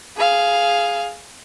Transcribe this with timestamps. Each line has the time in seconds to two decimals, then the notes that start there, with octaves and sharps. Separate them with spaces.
0.17 G#4 F5